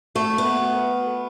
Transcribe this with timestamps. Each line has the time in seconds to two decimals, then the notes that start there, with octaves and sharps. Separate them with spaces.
0.15 A3 F#4
0.31 A4
0.38 B3
0.45 E5
0.62 F#4
0.77 B4
0.91 B4
1.07 A4